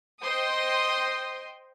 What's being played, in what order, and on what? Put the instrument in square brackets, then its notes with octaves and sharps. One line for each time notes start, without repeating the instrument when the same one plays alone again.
[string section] C5 D#5 G5 C6 D#6